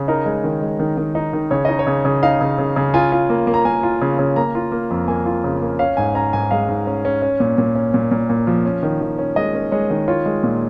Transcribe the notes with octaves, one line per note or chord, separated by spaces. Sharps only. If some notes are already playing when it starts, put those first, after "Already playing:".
Already playing: C#3
D#4 A#4
G#3
D#3
G#3
D#3
D#3
D#4
D#3
C#3 C#5
D#4 D#5
C#5
C#3
C#3
D#4 F5
C#3
C#3
C#3
F4 G#5
F4
A#3
A#3
A#5
A#3 G#5
F4
C#3
C#3
A#3 A#5
F4
A#3
F2
A#3 G#5
F4
C#3
A#3
C#4 F5
G#2 G#5
C#4 A#5
G#2 G#5
G#3 F5
G#2
C#4
C#4
C#4
A#2
A#2
C#4
A#2
A#2
A#2
F3
C#4
D#3
D#3
C#4
G#3 D#5
C#4
G#3 C#5
D#3
F4 C#5
G#3
A#2